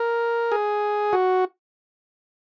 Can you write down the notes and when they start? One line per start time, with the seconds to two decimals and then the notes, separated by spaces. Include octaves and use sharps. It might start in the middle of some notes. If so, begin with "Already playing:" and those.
Already playing: A#4
0.52 G#4
1.13 F#4